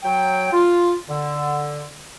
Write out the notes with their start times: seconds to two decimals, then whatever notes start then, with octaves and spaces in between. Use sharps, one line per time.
0.03 F#3 G5
0.52 F4
1.08 D3